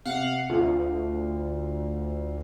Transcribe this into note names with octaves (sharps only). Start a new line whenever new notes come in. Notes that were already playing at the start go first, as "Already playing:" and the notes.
C3 F5 F#5
D2 F4